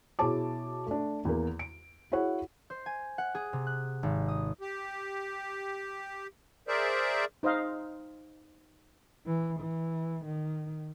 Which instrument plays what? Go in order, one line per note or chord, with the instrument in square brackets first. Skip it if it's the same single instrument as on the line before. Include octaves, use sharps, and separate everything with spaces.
[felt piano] B2 E4 G#4 C#5 A5 D6
A3 D4
E2 A#3
D7
E4 F#4 G#4 C#5 F#5
[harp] C5
G#5
F#5
G#4
C3
F#6
G#1
D#6
[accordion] G4
G#4 A#4 C5 D5 E5
[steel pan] D#4 C5 D#5 F5
[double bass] E3
E3
D#3